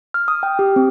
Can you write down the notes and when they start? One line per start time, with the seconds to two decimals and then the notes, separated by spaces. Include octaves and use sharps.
0.14 F6
0.28 D#6
0.43 G5
0.59 G4
0.76 C4